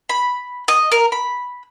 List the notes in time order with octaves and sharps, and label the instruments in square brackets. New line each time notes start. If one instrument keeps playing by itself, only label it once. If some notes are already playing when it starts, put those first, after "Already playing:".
[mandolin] B5
D#5
A#4
B5